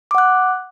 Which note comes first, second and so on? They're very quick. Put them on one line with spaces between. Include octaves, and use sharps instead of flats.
D6 F#5 F#6